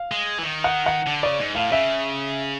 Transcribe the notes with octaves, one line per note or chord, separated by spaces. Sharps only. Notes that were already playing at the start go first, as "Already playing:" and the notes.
Already playing: F5
G#3
E3
D#3
F#5
F#5
D3
C#3 D5
G#2
A2 F5
C#3 E5